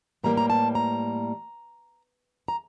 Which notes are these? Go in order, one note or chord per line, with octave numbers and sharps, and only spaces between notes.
A2 E3 G3 A#3 A#5
A#5
A5
A#5
A#5